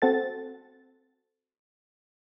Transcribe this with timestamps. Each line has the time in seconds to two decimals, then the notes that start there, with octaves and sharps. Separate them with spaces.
0.02 C4 F#4 A4 A6